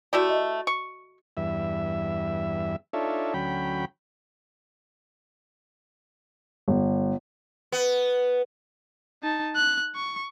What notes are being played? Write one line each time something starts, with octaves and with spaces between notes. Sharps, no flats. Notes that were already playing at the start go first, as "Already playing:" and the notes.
A3 E4 F#4 G4 D5
D#5
C#6
E2 G2 E5
D4 D#4 F4 A4 C#5 E5
D2 F#3 C#4 G5 B5
G1
B3
D#4 A5
F#6
C#6